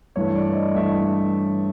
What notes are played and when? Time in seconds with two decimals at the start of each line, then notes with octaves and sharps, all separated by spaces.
0.16 G2 E3 A3 C#5
0.35 D5
0.55 D#5
0.75 G2 E3 A3 E5